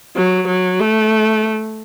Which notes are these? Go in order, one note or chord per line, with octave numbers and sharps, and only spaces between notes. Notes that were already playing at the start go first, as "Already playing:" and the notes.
F#3
F#3
A3